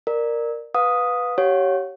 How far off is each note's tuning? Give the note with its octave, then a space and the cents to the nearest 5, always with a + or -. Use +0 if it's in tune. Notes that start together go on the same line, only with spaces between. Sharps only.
A#4 +0 D5 +20
B4 +0 F5 +35 D#6 +0
G4 -25 C#5 +0 F#5 -45